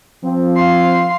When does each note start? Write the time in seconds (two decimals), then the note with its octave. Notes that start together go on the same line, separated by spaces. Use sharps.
0.24 F3 C4
0.56 F5 C6